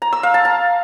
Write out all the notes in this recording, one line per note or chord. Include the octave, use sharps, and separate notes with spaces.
A#5
E6
F5
A5
A#5